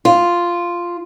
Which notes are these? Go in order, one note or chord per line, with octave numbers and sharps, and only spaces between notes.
F4